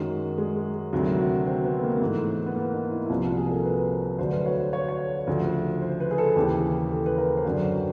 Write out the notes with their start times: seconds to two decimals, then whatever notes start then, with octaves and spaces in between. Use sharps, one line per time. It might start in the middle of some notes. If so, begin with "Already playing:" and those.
Already playing: F#2 D#3 F#3 G#3
0.38 G#3
0.93 D2 C3 D#3 F#3
1.46 C4
1.64 B3
1.83 A#3
1.97 A#3
2.01 G#2 E3 A3
2.46 B3
2.55 A#3
2.74 D#4
2.92 E4
3.06 E4
3.09 C2 A#2 F3 F4
3.24 F#4
3.37 G#4
3.47 A#4
3.50 A4
3.64 B4
3.92 C5
4.18 D2 D3 F#3 C5
4.32 B4
4.46 C#5
4.59 C5
4.73 C#5
4.88 C#5
5.27 D2 C#3 F3
5.82 C5
6.00 B4
6.11 G#4
6.18 A4
6.36 D#2 C#3 E3 G4
6.91 A4
7.06 B4
7.18 A#4
7.37 C5
7.45 F#2 D3 F#3 B4
7.63 C5